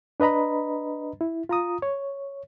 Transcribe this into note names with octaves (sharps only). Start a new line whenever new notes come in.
D4 B4 D#5 A#5 B5
E4
F4 A#5 D#6
C#5